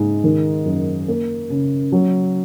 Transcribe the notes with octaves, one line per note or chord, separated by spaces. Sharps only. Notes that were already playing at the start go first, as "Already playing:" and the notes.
Already playing: G#2 G#3
D#3
F#2
A#3
C#3
F#3